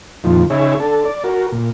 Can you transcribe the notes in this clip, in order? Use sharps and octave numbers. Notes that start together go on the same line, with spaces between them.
F2 A#2 D#3 F3
C#3 D#4 G#4 C#5 E5
D4 A4
D5
F#4 A#4
A#2